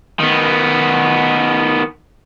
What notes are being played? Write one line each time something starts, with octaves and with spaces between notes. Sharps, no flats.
D#3 B3